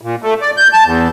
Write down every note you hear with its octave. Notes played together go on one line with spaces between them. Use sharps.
A#2
A3
D5
G6
A5
E2